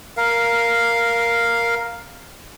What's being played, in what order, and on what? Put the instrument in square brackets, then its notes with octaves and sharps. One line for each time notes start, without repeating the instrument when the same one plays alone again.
[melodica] A#4 F5